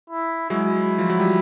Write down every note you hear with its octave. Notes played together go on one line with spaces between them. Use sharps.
E4
F#3 G#3 E4
F3
F#3
G3